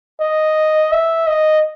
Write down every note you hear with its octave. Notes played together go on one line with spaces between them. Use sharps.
D#5
E5
D#5